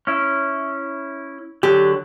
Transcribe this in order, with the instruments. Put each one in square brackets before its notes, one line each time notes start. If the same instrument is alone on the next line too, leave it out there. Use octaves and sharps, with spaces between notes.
[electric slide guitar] C#4 E4
[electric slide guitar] D3 F#3 [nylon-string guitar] G4